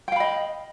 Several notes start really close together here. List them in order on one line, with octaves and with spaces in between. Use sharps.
G5 F5 B5 D#5